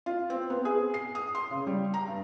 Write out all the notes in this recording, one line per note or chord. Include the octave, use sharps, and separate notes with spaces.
F4
C4
B3
G#4
C7
D#6
C6
C#3
G3
A#5
G2